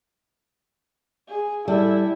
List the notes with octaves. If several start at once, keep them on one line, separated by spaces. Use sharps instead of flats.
G#4
G3 E4 A4